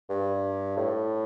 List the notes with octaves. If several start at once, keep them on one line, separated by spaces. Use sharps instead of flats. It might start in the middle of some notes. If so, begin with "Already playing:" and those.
G2
A2